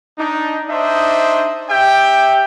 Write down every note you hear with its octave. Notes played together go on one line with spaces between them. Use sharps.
D4 D#4
D4 D#4 C5 D#5 E5
G4 E5 G5